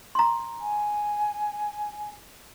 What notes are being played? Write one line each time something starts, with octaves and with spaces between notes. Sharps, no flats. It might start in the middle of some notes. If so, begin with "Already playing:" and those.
A#5 C6
G#5